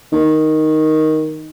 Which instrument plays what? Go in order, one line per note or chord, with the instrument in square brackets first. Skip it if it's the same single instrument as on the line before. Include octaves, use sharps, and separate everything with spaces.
[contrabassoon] D#3